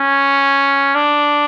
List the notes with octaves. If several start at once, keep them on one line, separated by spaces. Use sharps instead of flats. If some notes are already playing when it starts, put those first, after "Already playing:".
Already playing: C#4
D4